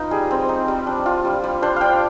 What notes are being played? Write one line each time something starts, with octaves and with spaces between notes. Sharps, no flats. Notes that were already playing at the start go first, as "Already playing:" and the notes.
Already playing: D#4 F4 B4
G3 G#4
C4
D#4
G3
D4
F4
G3
G3
D4 C5
G3 F5 G5